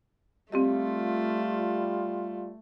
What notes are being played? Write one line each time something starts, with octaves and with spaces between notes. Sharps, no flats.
G3 A3 C4 F4 G4 D#5